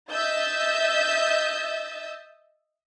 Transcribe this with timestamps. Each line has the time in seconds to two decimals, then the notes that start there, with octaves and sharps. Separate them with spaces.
0.13 D#5 E5 E6 G6 A6